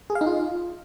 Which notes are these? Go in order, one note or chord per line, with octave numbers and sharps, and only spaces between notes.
G#4
F5
D#4
F4